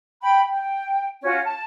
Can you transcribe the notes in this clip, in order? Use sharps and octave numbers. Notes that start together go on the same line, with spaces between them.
G5 B5
G5
C#4 F4 F#4
A5